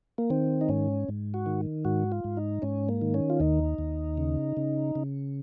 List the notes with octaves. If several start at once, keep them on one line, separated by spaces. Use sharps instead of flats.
A#3
D#3 C4
D#4
G#2 C#4
G#2
F#4
D#3
G#2 F#4
F4
G#2
D#4
G#2 C#4
A#3
D#3
C#4
F4
D#2 D#4
D#2
C#3
C#3
C#3